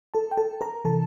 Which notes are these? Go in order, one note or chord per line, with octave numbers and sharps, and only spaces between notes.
A4 A5
G5
A4 A5
A#4 A#5
C3 E3 A4 A5